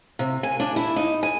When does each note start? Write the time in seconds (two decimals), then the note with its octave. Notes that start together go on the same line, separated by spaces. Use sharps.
0.19 C3
0.43 G#5
0.60 D4
0.76 E4
0.96 D#4
1.23 G#5